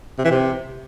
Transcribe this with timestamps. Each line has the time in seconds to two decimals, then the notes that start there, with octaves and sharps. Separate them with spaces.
0.18 C3
0.25 E3
0.31 C3